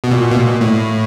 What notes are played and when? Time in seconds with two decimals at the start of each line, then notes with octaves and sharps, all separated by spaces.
0.04 B2
0.11 A#2
0.31 B2
0.36 A#2
0.61 A2